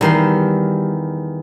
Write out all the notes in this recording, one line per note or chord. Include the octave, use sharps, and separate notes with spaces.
E2 D#3 G3 C6